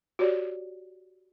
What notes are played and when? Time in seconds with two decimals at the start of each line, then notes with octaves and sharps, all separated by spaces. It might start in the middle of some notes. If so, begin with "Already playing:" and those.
0.19 F#4 G4 C#5 D5